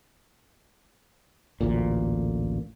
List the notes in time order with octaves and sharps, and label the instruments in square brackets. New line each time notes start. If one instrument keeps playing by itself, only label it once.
[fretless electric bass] A1 D2 A#2